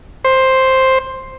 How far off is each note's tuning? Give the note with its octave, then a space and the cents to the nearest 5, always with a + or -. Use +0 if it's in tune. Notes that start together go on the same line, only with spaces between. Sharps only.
C5 +5